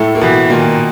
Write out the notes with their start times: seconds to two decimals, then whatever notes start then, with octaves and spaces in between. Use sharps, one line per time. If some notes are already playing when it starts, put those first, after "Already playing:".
Already playing: A2 A3
0.15 A#3
0.21 B2 E3 B3
0.50 A#2 D#3 A#3